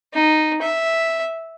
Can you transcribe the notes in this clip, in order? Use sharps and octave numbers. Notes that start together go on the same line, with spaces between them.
D#4
E5